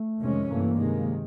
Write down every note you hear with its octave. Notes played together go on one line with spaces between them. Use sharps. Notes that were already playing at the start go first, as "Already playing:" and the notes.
Already playing: A3
F2 C3 D#3 G#3 C#4
G2 E3 A3 A#3
C3 D#3 G#3